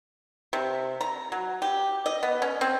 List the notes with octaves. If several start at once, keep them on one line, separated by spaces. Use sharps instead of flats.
C3
A#5
F#3
G4
D#5
B3
C#4
C4